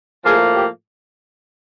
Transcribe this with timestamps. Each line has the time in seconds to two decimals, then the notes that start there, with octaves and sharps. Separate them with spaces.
0.24 A2 F3 A#3 G#4
0.55 G4